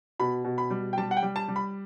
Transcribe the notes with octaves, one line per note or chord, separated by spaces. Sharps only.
B2 B5
B2
B5
G3
G5
G3 A5
F#5
G5
G3
A5
G3
B5